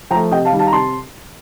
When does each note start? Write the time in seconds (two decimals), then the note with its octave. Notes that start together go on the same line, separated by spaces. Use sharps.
0.11 F3 G5 A#5
0.15 A3
0.31 C3 D#5 G5
0.45 F5 A5
0.52 D#3 G3
0.59 F5 A5
0.67 A#5
0.72 C3 A5 C6